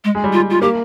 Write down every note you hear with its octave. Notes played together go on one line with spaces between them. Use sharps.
G#3
G#3
G3
F4
F4
A#3 G4